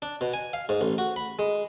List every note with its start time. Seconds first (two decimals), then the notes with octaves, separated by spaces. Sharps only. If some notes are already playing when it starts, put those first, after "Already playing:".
0.02 D4
0.21 B2
0.34 G#5
0.53 F5
0.69 G#2
0.81 A1
0.98 F#4
1.16 B5
1.39 G#3